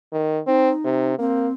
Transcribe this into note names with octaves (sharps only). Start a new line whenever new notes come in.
D#3
C4 D#4
C3
A#3 C4